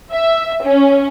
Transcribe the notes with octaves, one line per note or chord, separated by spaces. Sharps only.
E5
C#4